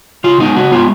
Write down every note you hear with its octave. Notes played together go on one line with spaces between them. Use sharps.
C#3 F4
G#3 B3 D#4
C#3 F#4
G#3 B3 F4